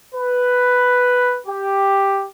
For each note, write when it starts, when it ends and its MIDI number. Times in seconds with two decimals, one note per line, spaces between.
0.14 1.38 71
1.47 2.26 67